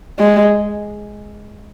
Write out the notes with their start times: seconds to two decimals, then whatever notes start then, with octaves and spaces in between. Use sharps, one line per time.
0.19 G#3